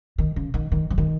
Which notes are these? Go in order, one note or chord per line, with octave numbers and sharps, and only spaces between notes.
D#3
C#3
D#3
D#3
F3
D#3